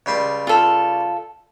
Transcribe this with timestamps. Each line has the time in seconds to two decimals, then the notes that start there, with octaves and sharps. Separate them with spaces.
0.06 C#2 G3 C6
0.47 F4 A4